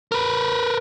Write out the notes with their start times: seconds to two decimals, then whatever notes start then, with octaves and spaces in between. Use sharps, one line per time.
0.12 A#4 B4